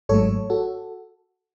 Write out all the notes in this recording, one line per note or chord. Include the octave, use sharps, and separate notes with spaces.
G#1 G#2 F#3 A3 A4 C#5
F#4 A4